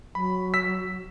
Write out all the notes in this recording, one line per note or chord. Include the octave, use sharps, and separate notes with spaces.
F#3 B5
E6 B6